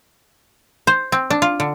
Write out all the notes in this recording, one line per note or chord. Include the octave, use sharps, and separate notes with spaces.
C5
C4
D4
F4
D3